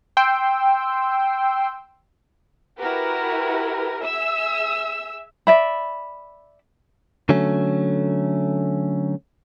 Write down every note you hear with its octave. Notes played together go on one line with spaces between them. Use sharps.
G5 C6 E6
E4 F#4 G4 A#4 B4
G#4 E5 E6
D5 E5 B5
D3 F#3 A3 C#4